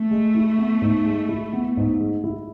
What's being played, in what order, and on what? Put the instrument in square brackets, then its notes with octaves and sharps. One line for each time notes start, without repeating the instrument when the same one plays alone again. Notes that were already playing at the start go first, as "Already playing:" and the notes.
Already playing: [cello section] A3
[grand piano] G#3
E4
B3
G#2
G#3
E4
B3
G#2
G#3
E4